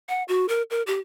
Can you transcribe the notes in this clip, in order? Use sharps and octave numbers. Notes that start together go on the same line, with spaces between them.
F#5
F#4
A#4
A#4
G4